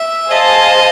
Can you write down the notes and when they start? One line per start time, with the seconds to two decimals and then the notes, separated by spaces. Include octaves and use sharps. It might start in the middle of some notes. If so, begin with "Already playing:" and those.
Already playing: E5
0.29 G#4 C5 D#5 F5 A5